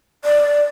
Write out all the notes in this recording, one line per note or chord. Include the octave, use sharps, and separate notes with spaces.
D5